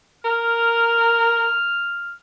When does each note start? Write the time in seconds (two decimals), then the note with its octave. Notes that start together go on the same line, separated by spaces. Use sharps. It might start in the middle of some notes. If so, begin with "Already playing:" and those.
0.24 A#4 F6